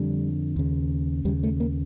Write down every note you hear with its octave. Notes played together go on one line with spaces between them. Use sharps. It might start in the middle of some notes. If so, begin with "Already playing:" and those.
Already playing: F2 D3 G3
D#2 C#3
D#2 C#3 G3
A3
A#3